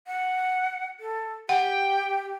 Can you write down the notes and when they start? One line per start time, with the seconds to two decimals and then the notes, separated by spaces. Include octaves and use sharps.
0.07 F#5
1.00 A4
1.49 G4 F#5 G5